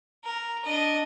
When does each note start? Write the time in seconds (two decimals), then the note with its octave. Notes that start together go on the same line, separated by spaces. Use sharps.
0.24 A#4
0.65 D4 D#5